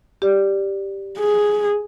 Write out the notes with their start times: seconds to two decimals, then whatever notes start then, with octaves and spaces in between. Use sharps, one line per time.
0.22 G4 D5
1.19 G#4